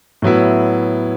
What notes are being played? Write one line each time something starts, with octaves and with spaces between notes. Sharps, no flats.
A2 F#3 B3 E4